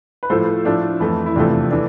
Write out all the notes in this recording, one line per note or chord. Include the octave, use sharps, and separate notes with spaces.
B4
A2 F3 A3 A4 C5
A2 F3 A3 D4
F2 E3 A3 E4
E4
E2 C3 F3 A3 D4
E3 A3 D4